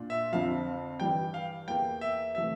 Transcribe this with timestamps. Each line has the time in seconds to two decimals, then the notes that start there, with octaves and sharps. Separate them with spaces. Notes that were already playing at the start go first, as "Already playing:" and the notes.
Already playing: A#2 D4 F4
0.10 E5
0.32 F2 D3 F3 F5
1.00 G2 E3 G3 G5
1.34 F5
1.68 E2 E3 A#3 G5
2.01 E5
2.35 C3 E3 A3 E5